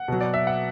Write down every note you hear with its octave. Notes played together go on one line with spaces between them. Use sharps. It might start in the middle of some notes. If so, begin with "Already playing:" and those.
Already playing: F#5
B2 F#3
D5
E5
F#5